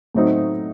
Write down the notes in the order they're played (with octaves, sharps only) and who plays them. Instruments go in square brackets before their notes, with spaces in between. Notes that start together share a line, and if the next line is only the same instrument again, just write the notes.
[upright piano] A2 F#3 A3 C4 D#4